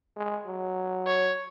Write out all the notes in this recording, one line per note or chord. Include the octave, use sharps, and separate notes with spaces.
G#3
F#3
C#5